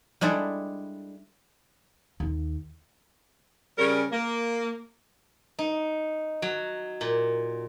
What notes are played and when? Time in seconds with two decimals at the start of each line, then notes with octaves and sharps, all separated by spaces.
0.21 G3 G#3 D4 E4 A4
2.20 D#2
3.78 C#3 G3 C#4 A#4
4.12 A#3
5.59 D#4
6.42 F#3
7.01 A#2